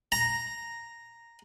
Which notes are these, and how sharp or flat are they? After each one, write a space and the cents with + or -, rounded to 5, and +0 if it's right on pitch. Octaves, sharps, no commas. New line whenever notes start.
A#5 -5